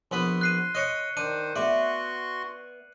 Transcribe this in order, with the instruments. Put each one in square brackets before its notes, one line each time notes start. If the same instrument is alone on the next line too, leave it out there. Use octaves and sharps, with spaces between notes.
[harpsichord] A#1 B3 B4 [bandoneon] C6
[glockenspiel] F#6 C7 D#7
[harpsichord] C#5 D#5 [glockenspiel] F#6 C#7
[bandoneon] D#3 C5 [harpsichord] D4 [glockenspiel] D#7
[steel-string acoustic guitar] B3 E5 [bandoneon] F#4 C6 C#6 [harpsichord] D5